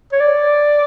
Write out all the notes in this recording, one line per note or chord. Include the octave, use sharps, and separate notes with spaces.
C#5
D5